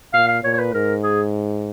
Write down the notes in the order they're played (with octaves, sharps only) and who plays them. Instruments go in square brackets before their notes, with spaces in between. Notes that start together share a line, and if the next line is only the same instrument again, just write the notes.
[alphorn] A#2 [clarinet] F5
[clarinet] F5
[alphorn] A#2 [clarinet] C#5
[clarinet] C#5
B4
[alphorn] G#2 [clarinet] A#4
[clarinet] G#4